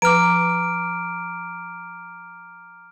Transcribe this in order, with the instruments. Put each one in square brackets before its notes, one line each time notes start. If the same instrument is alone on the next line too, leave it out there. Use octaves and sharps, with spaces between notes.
[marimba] F3 B4 [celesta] A#5 D6 [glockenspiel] F6 D7